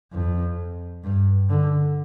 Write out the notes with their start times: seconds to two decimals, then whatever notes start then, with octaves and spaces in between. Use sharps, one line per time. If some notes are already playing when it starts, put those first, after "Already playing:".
0.13 F2
1.04 G2
1.50 D3